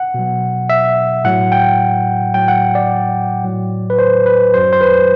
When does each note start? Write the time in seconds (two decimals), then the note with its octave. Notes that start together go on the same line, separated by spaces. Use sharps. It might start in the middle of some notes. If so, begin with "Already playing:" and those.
Already playing: F#5
0.14 B2 F#3
0.70 E5
1.24 A2 F#3 F#5
1.52 G5
2.34 A2 F#3 G5
2.48 F#5
2.62 F#5
2.75 D5
3.44 A2 F#3
3.90 B4
3.99 C5
4.26 B4
4.53 F#2 F#3 C5
4.73 C5
4.81 B4